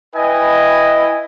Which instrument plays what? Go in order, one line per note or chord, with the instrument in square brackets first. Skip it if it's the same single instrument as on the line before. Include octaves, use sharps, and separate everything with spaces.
[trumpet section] E4 B4 D#5 G5 G#5